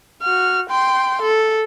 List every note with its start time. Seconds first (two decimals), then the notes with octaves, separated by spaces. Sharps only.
0.22 F#4 F6
0.69 G5 C6
1.22 A4